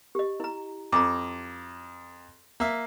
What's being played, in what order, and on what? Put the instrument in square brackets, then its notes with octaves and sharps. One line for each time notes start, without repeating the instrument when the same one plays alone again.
[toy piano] G4 D#5
E4 A#5
[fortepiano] F2 [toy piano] A#5 D6
[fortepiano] A#3 E5